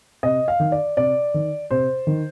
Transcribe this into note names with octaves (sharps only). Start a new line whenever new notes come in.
C3 D#5
F5
D#3
D5
C3 D5
D#3
C3 C5
D#3